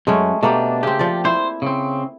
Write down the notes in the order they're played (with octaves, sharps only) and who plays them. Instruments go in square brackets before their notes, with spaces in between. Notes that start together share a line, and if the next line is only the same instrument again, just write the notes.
[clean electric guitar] F#2 [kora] G#3 A3 C#4
[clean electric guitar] B2 D4 [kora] A3 A#3 G4
[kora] C#3 C4 [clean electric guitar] G4
[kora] F3 D5
[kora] E4 [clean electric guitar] C5
[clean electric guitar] C#3 C4